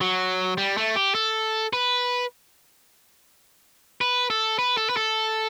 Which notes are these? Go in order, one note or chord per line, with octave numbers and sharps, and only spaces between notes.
F#3
G3
A3
G4
A4
B4
B4
A4
B4
A4
B4
A4